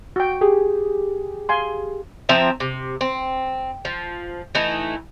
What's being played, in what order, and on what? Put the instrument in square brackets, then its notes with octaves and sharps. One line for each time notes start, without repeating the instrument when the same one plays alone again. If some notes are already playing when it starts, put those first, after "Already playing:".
[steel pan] F#4 G5
[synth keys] G4 G#4
[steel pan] F5 G#5 C6
[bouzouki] F3 C4 E5 A#5
C3
C4
F3
E3 A3 D#4 E4